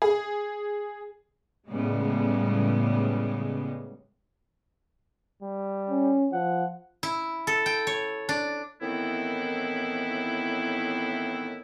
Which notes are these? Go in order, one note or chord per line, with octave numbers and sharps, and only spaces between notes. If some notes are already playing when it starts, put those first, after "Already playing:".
G#4
A2 C#3 G3 G#3 B3
G3
C#4
F3 F#5
E4
A4
G5
C#5
D4
A2 D#3 E3 B3 C4 E4